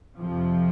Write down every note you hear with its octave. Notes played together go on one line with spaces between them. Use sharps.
F2 C3 F3